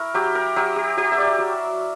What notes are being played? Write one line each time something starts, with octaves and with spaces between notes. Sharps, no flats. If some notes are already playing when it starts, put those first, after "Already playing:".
Already playing: E4 A#4 C#5
F#3 G4
A#4
F#3 G4
G4
F#3 G4
E5
D5
F#3